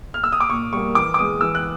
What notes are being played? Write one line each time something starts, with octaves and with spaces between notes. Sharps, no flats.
F6
E6
D#6
D6
A#2 C#6
G3 A#3 C#6
E3 D6
D6
G#3 B3 D#6
E3 E6
F#6